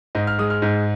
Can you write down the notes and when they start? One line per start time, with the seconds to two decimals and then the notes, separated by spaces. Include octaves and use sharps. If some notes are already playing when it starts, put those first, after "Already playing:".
0.15 G#2 D#5
0.27 F6
0.38 G#3 D#6
0.50 F6
0.62 G#2